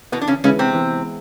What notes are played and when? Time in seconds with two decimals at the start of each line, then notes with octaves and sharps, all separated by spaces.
0.12 B2 E3 B3
0.21 D4
0.28 C#3 C#4
0.44 C#3 G#3 B3 C#4 E4
0.59 C3 C4
0.74 E3